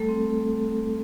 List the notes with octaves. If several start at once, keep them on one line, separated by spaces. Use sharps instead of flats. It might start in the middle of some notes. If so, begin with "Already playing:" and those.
Already playing: G3 A3 A4
C4
A3